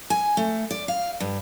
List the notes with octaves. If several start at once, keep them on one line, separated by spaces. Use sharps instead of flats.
G#5
A3
D5
F5
G2